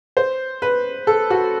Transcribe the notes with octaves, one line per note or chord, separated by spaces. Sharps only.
C5
B4
A4
F#4